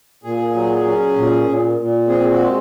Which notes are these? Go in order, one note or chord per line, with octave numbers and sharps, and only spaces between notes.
A#2 G#4
F#3
C#4
A#2
A#2
A#2
C4 G#4
F#4
G#3